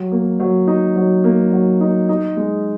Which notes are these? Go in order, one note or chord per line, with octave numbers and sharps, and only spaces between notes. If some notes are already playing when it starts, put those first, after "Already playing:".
Already playing: F#3
A#3
F#3
D#4
F#3
A#3
F#3
D#4
D#4
G#3